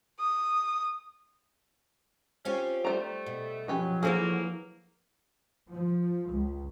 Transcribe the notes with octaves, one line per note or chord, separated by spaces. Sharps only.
D#6
C4 C#4 F4 G4
G3 A3 C5 A#5
B2
F3 F#3 C#4 G4 B4
D3 E3 A#3 B3 G#4 A4 C5
F3
C#2